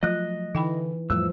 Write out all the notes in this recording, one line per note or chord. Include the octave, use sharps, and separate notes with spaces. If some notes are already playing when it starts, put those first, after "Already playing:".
F3 F#3 A3 F4 D#5 F#6
D3 E3 D#4 G5 B5
F2 A2 F3 G3 E6